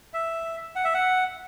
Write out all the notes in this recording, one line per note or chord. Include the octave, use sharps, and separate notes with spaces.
E5
F#5
E5
F#5